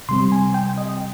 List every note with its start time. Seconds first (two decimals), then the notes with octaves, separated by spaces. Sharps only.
0.09 C3 G3 C4 C6
0.32 G#5
0.54 G5
0.78 D#5